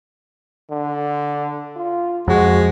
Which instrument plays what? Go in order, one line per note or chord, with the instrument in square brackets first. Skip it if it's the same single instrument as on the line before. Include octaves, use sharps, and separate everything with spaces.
[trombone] D3
F4
[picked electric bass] F2 [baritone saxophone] G#3 [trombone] F#4